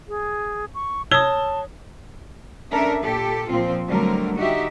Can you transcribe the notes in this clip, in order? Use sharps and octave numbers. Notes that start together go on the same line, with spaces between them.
G#4
C#6
C#5 A5 D#6 E6 G#6 G7
C#4 D4 A4 A#4 E5
A#2 G4 A4
A#2 F3 C4 F4
D3 F#3 G3 A3 C4 A#4
D#4 F#4 G4 E5